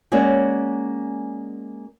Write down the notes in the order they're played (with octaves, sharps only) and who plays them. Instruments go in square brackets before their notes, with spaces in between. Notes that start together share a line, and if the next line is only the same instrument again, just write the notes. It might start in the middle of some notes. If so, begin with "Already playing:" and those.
[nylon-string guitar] G#3 A#3 C#4 F#4 C#5 D5